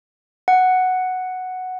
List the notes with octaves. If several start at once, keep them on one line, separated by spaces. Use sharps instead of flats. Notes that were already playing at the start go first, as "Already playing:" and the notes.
F#5